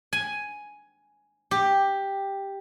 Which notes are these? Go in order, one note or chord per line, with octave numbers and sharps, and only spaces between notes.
G#5
G4